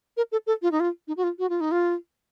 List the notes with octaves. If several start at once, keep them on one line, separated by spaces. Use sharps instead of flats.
A#4
A4
A4
F4
D#4
F4
D#4
F#4
F4
F#4
F4
D#4
F4